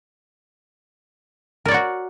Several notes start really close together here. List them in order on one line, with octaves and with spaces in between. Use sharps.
A#4 D5 C#5 F#4